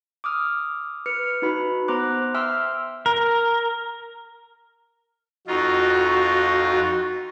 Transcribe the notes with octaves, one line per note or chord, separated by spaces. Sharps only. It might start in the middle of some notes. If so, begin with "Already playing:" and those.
D6 D#6 F6
B4 F6 C#7
D#4 F#4 B4 B5
B3 C5 A#5 C6 D6 F#6
E5 G5 C6 E6 F6
A#4
F2 D#4 F4 F#4